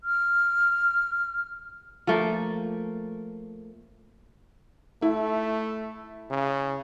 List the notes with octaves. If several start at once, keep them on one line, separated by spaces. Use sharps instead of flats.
F6
F3 A3 A#3
A3 E4
C#3